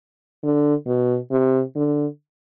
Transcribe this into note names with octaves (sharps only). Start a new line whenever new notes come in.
D3
B2
C3
D3